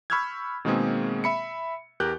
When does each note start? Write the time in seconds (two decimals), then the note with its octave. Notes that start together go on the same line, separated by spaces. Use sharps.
0.10 B5 C#6 E6 F6 G6 G#6
0.65 B2 D#3 G#3 A#3 C4 G#4
1.24 E5 B5 C#7
2.00 E2 G4 A#4 F#6 G6